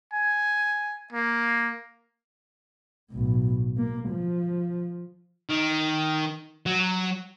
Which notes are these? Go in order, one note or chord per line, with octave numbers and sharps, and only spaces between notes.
G#5
A#3
B1 A2
A#3
F3
D#3
F#3